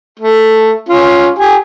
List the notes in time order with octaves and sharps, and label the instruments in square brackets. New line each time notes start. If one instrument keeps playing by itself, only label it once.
[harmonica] A3
C#4 F4
G4 G#5